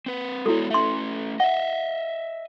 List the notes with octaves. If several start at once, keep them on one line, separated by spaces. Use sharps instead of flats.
C4 B4
G#3 B3 E4 F#4 A4 C#5
A3 C#4 E5 C6
D#5 E5 F#5